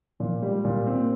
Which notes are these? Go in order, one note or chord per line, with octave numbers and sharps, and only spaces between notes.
A#2 F3
G3
G#3
A#2
C4
A#3